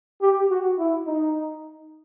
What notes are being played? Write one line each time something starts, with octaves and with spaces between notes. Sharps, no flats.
G4
F#4
E4
D#4